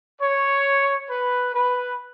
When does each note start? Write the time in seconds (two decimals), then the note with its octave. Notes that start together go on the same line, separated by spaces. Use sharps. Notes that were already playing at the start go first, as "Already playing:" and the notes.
0.22 C#5
1.09 B4
1.54 B4